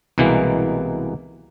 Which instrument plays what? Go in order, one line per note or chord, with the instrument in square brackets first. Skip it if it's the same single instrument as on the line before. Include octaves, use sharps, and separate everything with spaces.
[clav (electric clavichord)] C2 B2 E3 G#3 A#3